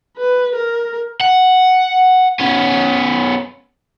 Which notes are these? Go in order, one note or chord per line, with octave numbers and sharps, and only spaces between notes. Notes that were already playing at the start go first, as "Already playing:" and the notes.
B4
A#4
F#5
B3 C#4